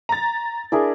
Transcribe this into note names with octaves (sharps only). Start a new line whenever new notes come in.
A#5 A6
D4 E4 G#4 A#4